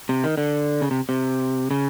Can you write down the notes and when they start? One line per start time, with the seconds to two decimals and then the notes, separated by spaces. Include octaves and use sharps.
0.09 C3
0.24 D#3
0.37 D3
0.81 C#3
0.91 C3
1.09 C3
1.71 C#3